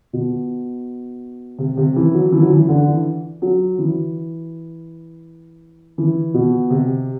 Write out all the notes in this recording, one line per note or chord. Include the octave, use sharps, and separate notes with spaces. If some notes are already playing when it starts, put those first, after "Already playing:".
B2
C3
C3
E3
F#3
E3
F#3
E3
D3
E3
F#3
E3
E3
B2
C3